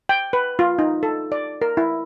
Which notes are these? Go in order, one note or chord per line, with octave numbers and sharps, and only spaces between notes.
G5
B4
F4
D#4
A4
D5
A#4
E4